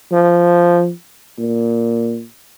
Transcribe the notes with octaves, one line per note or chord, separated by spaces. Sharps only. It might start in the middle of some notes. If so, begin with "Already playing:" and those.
F3
A#2